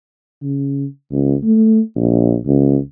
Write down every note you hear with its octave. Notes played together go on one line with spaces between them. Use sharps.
C#3
C#2
A3
A#1
C#2